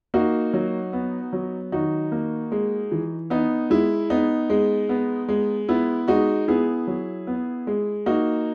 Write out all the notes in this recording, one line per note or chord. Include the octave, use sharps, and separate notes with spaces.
A#3 D#4 F#4
F#3
B3
F#3
D#3 D#4 F#4
A#3
G#3
E3
B3 D#4
G#3 E4
B3 D#4
G#3
B3
G#3
B3 E4
G#3 D#4 F#4
B3 E4 G#4
F#3
B3
G#3
A#3 D#4 F#4